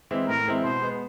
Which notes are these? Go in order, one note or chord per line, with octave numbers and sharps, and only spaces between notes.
E3 G#3 C4 E4
A2 A#4
E3 G#3 C4 E4
B2 C5
G#3 B3